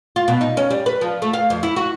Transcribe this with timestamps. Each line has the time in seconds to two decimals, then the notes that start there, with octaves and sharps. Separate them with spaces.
0.16 F4
0.28 B2
0.41 D#4
0.57 C#4
0.70 G3
0.86 B4
1.01 F3
1.22 A3
1.33 F5
1.50 F2
1.63 E4
1.76 F#4